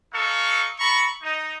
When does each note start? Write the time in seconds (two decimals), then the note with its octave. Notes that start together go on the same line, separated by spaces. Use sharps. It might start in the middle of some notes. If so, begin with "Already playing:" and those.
0.13 D#4 A4 F5 C#6
0.79 A4 A#5 B5 C#6
1.23 D#4